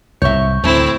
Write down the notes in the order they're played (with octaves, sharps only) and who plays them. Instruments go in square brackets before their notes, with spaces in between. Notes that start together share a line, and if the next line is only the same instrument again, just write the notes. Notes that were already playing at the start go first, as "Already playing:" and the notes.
[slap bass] C2 G#2 [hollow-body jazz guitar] C#5 E5 [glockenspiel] C#6 G6
[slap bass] D2 [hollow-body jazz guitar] A2 [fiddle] C4 E4